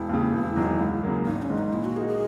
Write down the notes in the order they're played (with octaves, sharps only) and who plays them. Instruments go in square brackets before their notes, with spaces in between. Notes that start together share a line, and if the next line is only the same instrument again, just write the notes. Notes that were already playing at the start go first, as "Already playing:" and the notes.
Already playing: [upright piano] E1 [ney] E4
[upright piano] D#2 C#3
E1
E2 D#3 F#3
C#2
C#3 F#3 A#3
[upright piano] G#1 [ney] D#4
[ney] C#4
[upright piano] G#2 D#3
[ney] D#4
[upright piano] A#2 [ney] E4
[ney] F#4
[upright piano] A#3 D#4 F#4 [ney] G#4
[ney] G#4